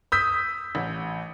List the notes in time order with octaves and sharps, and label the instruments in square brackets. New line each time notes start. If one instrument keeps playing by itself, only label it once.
[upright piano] D#6 E6 G6 B6
A1